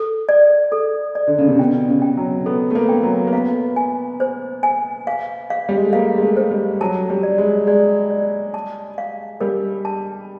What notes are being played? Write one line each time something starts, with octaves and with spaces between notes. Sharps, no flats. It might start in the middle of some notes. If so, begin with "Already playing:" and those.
Already playing: A4
D5
A4
D5
D3
C#3
C3
B2 G5
C#3
G5
F#3
B3 A4
A3
A#3
G5
F#3
A#3
B3 F5
G#5
C5
G#5
F5
F5
G3
G#3
A3
A#3 F5
G#3
A3
C5
G3
F#3 A5
G3
D5
G#3
G#3 D5
D5
A5
F5
G3 A#4
A5